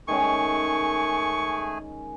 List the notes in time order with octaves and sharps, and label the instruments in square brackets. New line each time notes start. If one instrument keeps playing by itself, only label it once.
[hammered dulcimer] D#3 G#3 C#4 [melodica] A3 G#4 G#5 [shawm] C#6